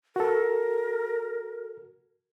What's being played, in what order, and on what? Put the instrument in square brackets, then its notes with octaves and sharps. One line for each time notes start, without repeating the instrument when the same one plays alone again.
[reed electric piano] F#4 A4 [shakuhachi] A#4